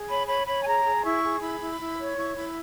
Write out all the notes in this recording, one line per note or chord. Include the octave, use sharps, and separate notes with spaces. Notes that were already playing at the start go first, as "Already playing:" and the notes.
Already playing: G#4
C#5 B5
C#5 B5
C#5 B5
G#5
G#4 A#5
G#4
B5
E4 C#6
G#4
E4 B5
E4
E4
C#5
E4 C#6
E4 B5